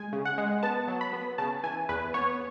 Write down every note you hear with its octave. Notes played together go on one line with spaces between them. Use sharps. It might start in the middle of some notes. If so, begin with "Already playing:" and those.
Already playing: G#3 G#5
C#3
F#5
G#3
B3 A5
F#3
B5
B3
C#3 A5
E3 G#5
E2 B4
B3 C#5